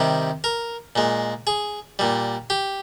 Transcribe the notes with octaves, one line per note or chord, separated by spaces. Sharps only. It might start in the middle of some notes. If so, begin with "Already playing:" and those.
Already playing: C3 D#3 G3
A#4
A#2 G#3
G#4
A#2 G3
G4